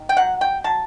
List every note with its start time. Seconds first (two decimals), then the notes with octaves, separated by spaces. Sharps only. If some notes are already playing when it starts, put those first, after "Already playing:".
Already playing: D#3
0.09 G5
0.17 F#3 F#5
0.41 G5
0.64 F#3 A5